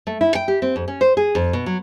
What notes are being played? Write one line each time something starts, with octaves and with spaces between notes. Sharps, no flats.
A3
E4
G5
G4
C4
F2
C#4
C5
G#4
F2
B2
F#3